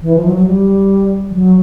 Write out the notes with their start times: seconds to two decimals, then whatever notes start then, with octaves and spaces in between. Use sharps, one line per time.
0.02 E3
0.16 F3
0.25 F#3
0.36 F#3
0.46 G3
1.31 F3
1.35 F#3